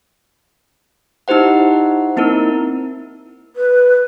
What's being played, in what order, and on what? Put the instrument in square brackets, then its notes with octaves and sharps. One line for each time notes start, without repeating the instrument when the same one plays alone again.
[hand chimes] D#4 E4 G4 C5 F#5
A#3 C4 D#4 E4 A#4
[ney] B4